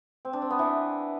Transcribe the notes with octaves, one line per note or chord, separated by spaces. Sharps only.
C4
D4
C4
B3
E3